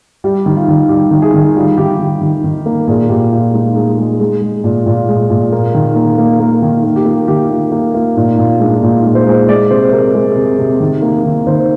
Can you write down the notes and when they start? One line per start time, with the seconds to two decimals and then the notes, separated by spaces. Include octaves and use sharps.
0.24 G3 G4
0.46 D#3
0.56 F4
0.68 D#3
0.89 G3 G4
1.11 D#3
1.22 G#4
1.34 D#3
1.56 G3 F4
1.78 D#3 G4
1.99 D#3
2.21 D#3
2.44 D#3
2.66 A#3
2.87 A#2 G#4
3.09 A#2 G4
3.32 A#2 F4
3.53 G#3 D#4
3.76 G#3
3.98 G#3
4.20 G#3
4.42 G#3
4.64 A#2
4.86 A#2 F4
5.08 G#3
5.30 A#2
5.52 A#3
5.74 D#3
5.96 A#3
6.18 A#3
6.40 A#3
6.62 D#3
6.84 A#3
6.96 G4
7.06 A#3 F4
7.28 D#3 G4
7.50 A#3 F4
7.72 A#3 G4
7.94 A#3 F4
8.16 A#2 D#4
8.38 A#2 F4
8.60 G#3 D4
8.73 F4
8.82 A#2 D#4
9.05 G#3
9.15 C5
9.27 G#3
9.49 G#3 D5
9.70 C3 C5
9.93 C3 A#4
10.15 G#3 G#4
10.37 C3
10.59 C3
10.80 D#3
11.02 A#3
11.24 D#3
11.47 D#3 C5